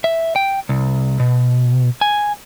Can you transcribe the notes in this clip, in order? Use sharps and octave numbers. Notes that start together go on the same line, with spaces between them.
E5
G5
C2
B2
G#5